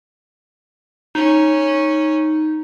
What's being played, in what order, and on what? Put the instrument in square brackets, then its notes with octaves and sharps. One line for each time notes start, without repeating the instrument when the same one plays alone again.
[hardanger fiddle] C#4 [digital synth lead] D#4